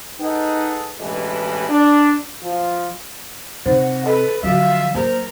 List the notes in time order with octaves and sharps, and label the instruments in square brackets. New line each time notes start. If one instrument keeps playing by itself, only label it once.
[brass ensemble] D#4 G#4 A4 B4 D#5 F#5
A1 G2 B2 E3 G#3
D4
F3 F4
[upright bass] C3 [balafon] D#4 C5 [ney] F#5
[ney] A4 [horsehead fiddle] B4 [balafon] D#5
[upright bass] D3 F3 [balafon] F#3 F#4 [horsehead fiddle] E5 [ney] F5
[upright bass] A#3 [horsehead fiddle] A#4 [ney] C5